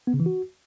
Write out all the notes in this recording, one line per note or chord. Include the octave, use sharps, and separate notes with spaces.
B3
C#3
E3
F#4